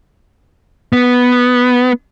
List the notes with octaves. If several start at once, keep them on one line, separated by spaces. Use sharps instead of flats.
B3